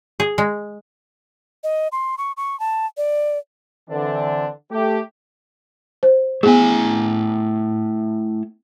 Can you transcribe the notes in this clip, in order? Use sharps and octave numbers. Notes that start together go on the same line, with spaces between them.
G#4
G#3
D#5
C6
C#6
C#6
A5
D5
D3 E3 C4 D4
A3 G4
C5
A3 B3 E4 G#4 G#5